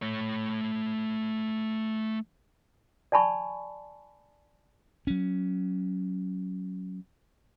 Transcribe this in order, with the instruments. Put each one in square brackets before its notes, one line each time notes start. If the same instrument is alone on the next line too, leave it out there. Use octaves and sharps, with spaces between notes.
[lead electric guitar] A3 C#5
[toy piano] D5 G#5 A5 B5 C#6
[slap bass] F#3 C#4